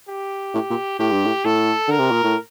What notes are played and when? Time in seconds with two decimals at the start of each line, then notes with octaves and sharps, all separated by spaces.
0.09 G4
0.54 A2
0.70 A#2
0.99 A2 G4
1.12 G2
1.26 A2
1.45 A2 A4
1.88 D3 A#4
1.99 C3
2.11 A#2
2.24 A2